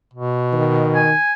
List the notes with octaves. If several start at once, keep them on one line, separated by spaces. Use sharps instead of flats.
B2
D#3
G#5